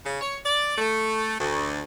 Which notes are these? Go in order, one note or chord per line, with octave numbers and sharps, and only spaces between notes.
C#3
C#5
D5
A3
D2